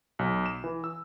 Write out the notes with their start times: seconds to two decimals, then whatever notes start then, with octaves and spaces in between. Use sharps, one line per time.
0.19 B1
0.46 E7
0.64 E3
0.84 E6